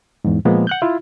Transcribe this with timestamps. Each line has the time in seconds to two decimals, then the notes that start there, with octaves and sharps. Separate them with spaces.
0.24 E2 G#2
0.45 A#2 F3 G#3 A#3 B3
0.67 F#5 F#6 G6
0.82 E4 F4